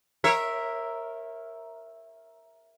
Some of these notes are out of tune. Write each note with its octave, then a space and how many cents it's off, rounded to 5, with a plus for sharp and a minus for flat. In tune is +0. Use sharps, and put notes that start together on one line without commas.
A#4 +0 C#5 -30 E5 +0